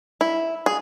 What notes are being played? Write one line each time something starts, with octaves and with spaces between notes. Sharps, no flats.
E4
G#4